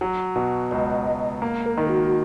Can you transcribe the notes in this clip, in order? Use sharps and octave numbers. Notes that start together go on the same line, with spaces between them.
F#3
B2
C#2 D#5
C#2
A#3
A#4
D#3
F#4